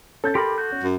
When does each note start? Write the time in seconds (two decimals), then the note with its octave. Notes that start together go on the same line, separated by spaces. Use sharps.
0.24 C#4 A4 G6 A6
0.35 G4 A#4 B5 C6 D6
0.58 F#4 G6
0.72 C#4
0.84 F#2